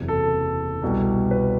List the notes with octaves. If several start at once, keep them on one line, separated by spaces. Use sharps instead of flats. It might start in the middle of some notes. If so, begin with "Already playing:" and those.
Already playing: F#1 E2 C3 F#3
A4
C2 B2 G3
B4